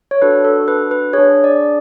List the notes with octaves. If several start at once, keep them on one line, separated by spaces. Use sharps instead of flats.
C#5
D4 F#4 A4 B4
A4
B4
B4
D4 G#4 C#5
D5